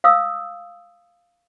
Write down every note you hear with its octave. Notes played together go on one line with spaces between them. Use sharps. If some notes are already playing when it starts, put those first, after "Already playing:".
F5 D#6 E6